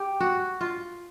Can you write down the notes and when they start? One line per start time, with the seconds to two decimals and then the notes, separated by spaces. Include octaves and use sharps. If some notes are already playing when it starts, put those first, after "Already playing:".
Already playing: G4
0.20 F#4
0.61 F4